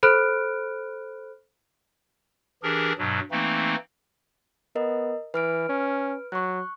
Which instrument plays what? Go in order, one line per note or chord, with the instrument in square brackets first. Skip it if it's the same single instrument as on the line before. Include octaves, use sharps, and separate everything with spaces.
[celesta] A4 C5 B5 F6 F#6 D7
[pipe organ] E3 D4 G4 G#4 A#4
G2 B2 F#3
E3 A3 A#3 C4 D#4
[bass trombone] B3 [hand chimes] A#4 D#5
[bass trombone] E3 [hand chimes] B4 F6 D7
[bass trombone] C#4
[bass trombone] F#3 [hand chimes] C#6 F#6